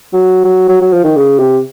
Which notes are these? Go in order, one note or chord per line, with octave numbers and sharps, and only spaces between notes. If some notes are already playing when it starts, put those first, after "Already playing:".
F#3
F#3
F#3
F#3
F3
D#3
C#3
C3